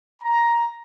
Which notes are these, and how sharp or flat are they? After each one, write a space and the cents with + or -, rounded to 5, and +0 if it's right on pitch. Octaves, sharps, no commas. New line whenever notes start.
A#5 +10